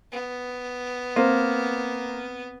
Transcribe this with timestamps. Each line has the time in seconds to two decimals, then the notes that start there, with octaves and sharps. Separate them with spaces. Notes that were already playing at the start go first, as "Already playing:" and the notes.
0.11 B3
1.16 A#3 C4 C5